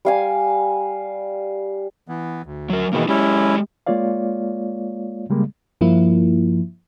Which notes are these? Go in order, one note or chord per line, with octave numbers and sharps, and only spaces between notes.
G3 F5 G#5
E3 B3
D2
F#3 A#4
B2 D#3 E3 A#3 E4 G#4
G#3 C#4 E4 G4
G#3 A#3 F4 C#5 D5 F5
C#3 G3 G#3 A#3
G2 F3 A#3 E4